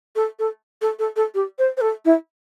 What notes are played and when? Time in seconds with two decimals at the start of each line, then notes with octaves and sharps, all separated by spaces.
0.16 A4
0.39 A4
0.81 A4
0.99 A4
1.16 A4
1.35 G4
1.59 C5
1.77 C5
1.81 A4
2.05 E4